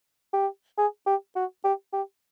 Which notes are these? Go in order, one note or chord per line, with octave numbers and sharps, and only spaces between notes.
G4
G#4
G4
F#4
G4
G4